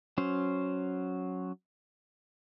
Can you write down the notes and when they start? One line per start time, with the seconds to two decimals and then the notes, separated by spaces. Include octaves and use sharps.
0.18 F#3 C#4 C5